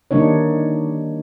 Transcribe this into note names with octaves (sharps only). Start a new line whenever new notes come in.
D#3 G3 A#3 D4 D#4 C#5